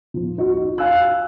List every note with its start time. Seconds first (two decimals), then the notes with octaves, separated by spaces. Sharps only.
0.14 F3
0.38 D#4 F#4
0.51 F#4
0.78 F5 G#5 E6 F#6